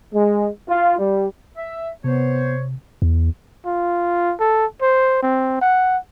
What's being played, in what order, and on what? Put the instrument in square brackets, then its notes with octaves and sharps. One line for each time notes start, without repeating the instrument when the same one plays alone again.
[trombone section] G#3
F4
G3
[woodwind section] E5
[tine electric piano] C3 [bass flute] B3 [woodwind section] C5 C#5
[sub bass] E2
[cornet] F4
A4
C5
C4
F#5